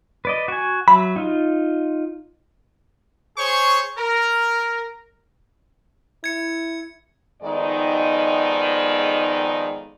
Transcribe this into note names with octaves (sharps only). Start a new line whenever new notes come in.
B4 D5 D#5
F#4 G#5
F#3 E5 B5
D#4 F4
G#4 C5 C#5 C#6
A#4
E4 G#6 C#7
F2 D#3 G#3 B3 D#4 D5